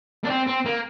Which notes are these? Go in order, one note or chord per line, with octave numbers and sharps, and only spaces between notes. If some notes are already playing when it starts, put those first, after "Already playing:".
D4
C4
C4
A#3